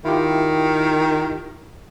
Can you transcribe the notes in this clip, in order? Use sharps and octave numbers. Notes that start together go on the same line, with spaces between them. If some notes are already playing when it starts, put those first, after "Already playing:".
D#3 E4 F4 G4